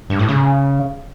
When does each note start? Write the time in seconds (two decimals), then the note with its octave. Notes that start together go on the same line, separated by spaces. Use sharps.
0.10 G2
0.19 A2
0.29 C#3